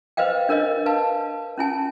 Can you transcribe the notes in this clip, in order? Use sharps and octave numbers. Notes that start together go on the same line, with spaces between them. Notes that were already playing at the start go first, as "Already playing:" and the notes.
B4 C5 D#5 F5 G5
D4 A#4 C#5 D#5
B4 F5 A5
C#4 E4 G#5 A5